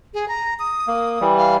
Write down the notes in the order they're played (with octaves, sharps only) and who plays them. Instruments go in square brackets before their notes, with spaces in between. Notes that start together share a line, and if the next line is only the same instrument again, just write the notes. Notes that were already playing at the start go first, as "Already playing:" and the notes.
[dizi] G#4
A#5
D#6
[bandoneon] A#3
E3 G3
[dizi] F5